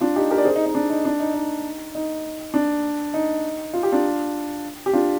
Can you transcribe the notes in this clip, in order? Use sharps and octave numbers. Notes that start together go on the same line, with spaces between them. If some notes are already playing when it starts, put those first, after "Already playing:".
D4 F4
D#4 G4
G4 A#4
D5
G#4 C5
D#4
D#4
D4
D#4
D4
D#4
D#4
D#4
D4
D#4
F4
G4
D4 F4
G4
D4 F4